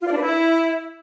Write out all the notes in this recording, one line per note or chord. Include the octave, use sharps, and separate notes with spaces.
F4
D5
D4
B4
E4